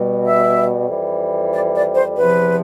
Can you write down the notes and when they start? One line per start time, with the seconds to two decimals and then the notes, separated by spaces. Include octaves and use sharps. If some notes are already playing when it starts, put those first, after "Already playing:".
Already playing: B2 G3
0.25 E5
0.88 F2 E3 G3
1.52 D5
1.74 D5
1.95 C5
2.16 E2 C3 F3 B4